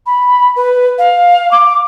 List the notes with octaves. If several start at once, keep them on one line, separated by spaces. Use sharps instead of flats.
B5
B4
F5
D6